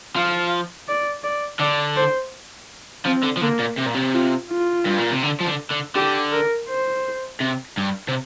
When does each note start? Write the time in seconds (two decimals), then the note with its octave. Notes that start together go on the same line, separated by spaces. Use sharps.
0.16 F3 F5
0.88 D5
1.23 D5
1.60 D3 D5
1.96 C5
3.05 F3 C4
3.23 D3
3.37 F3
3.42 D3 A#3
3.60 A#2
3.78 C3
3.87 A#2
3.95 C3
4.14 F4
4.51 F4
4.85 G2
4.98 A#2
5.11 C3
5.23 D3
5.41 F3
5.47 D3
5.71 D3
5.96 D3 G4
6.32 A#4
6.69 C5
7.40 C3
7.77 G2
8.08 C3